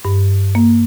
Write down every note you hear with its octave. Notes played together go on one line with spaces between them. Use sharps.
G2
A#3